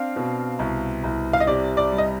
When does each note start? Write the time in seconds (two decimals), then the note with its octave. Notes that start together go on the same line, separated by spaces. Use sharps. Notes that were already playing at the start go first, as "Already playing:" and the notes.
Already playing: C4 D4 F5
0.16 B2
0.59 C2
1.04 C2
1.33 F5
1.40 D#5
1.47 C3 D5
1.77 D5
1.92 G3
1.98 D#5